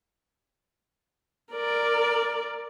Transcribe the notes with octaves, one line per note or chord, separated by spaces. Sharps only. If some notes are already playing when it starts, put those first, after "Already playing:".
A#4 D5